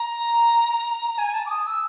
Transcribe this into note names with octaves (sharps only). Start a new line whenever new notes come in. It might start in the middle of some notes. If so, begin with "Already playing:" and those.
Already playing: A#5
G#5
A5
D6
D#6
E6